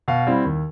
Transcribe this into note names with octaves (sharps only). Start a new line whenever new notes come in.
B2 F5
G3 C4 E4
D#2